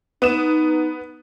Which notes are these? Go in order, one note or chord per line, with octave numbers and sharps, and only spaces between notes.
B3 D#4 D#6 E7